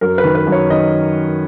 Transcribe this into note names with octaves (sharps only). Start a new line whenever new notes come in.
F#2 A#4
B4
D#3
B4
F#2
C#5
D#3 D#5